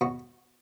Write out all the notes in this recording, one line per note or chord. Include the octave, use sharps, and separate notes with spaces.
B2 F#4